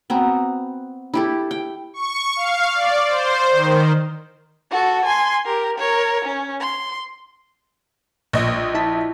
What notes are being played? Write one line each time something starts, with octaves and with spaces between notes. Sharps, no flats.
B3 C4 F#4 A#5
E4 G4 A4
G5
C#6
F5
D5
C5
D#3
F#4 A4
G#5 C6
G4 A#4
A#4 C#5
C#4
C6
A#1 A#2 D#5
E4 A5 B6